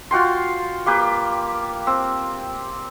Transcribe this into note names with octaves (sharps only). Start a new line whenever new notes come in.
F4 F#4 G5 C6
A#3 G4 B4
C4